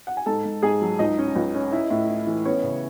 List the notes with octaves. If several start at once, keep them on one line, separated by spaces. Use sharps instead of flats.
F#5
G#5
G#2 A4 A5
G#2
G#2 G#4 G#5
F#3
C#2 D#4 D#5
C#4
C#2
C#4
E4
A2
E4
E3
B3 C#4 C#5
C#3